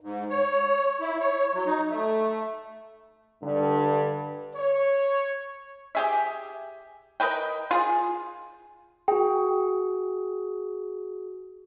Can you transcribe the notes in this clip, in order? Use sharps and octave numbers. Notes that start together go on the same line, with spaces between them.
G#2
C#5
E4
C#5
F#3
D#4
A3
G2 D3
C#5
G4 G#4 E5
A#4 B4 D#5 G5
F4 G#4
F#4 G#4 G5